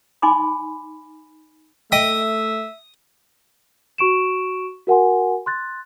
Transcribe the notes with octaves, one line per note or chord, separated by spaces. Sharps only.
D#4 G#5 B5 C6 D6
A3 D#5 E5 G5 D#6 B6
F#4 C#6 D7 E7
F#4 A#4 F#5 G#5 C6
C6 F#6 A6